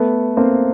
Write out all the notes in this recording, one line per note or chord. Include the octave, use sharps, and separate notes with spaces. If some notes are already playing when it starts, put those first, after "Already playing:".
Already playing: A3 B3
A#3 C4